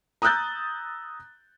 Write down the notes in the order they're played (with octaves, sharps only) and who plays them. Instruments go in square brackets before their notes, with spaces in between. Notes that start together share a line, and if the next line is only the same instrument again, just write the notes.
[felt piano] A#5 D#6 E6 F#6 G6 A6